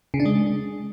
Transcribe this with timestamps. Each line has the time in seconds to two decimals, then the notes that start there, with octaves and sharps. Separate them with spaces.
0.14 C#3
0.20 D4
0.25 G#3